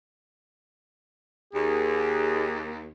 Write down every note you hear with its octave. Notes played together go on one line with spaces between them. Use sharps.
D#2 G#4